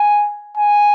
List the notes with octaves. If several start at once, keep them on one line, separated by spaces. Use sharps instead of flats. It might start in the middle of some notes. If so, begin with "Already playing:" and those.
Already playing: G#5
G#5